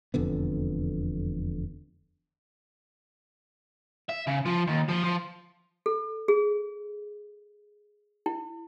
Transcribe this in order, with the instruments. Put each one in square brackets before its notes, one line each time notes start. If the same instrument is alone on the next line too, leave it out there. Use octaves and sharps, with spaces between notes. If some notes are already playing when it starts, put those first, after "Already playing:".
[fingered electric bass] E1 F2 D3 B3
[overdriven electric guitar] E5
C#3
F3
D#2
F3
F3
[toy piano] A4
G#4
E4